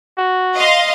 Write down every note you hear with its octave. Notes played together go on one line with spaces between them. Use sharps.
F#4
D#5 F5 C6